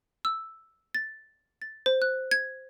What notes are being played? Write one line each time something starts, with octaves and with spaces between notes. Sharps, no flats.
E6
A6
A6
C5
F#6
G#6